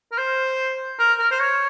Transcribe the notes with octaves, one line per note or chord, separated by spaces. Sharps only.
A#4
C5
A#4
A#4
C5
C#5